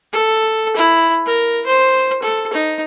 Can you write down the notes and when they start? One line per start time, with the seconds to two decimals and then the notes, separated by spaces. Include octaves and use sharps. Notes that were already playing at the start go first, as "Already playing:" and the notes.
0.13 A4
0.76 E4
1.26 A#4
1.66 C5
2.22 A4
2.53 D#4